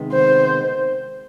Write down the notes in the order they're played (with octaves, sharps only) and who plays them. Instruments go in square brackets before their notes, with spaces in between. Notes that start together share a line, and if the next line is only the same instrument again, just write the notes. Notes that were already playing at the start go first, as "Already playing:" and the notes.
Already playing: [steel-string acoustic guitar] C3 D#3 G#3 B3
[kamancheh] C5